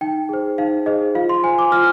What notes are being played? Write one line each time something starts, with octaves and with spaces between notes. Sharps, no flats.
D#4 G5
G#4 C5
D#4 F5
G#4 C5 D#5
F4 F5
C6
C5 G#5
D6
F4 F6